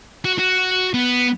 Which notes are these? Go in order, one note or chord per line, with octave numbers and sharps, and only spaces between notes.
F#4
F#4
B3